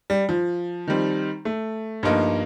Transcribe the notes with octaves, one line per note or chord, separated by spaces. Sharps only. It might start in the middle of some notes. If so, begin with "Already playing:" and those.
G3
F3
D#3 G3 C4
A3
G2 F3 A#3 D#4